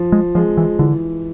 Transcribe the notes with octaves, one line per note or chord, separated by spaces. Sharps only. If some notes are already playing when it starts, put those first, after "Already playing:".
Already playing: F3
G#3
F3 G#3
E3
D3 E3